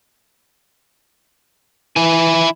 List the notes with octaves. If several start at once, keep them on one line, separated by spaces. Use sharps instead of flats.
E3 E4 G#5